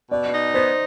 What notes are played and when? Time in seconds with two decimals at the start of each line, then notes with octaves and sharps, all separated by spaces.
0.11 B2 D5
0.33 D#4
0.54 B3 C5